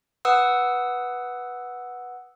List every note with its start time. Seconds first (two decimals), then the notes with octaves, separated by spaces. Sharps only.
0.25 B4 F#5 D#6 E6